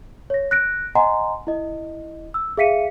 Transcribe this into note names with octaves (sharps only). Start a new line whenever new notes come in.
C#5 A#6
F#6 A#6 D7
D#5 F#5 G#5 A#5 C6
E4 D#5
E6
G#4 E5 F5 B6 C#7 D#7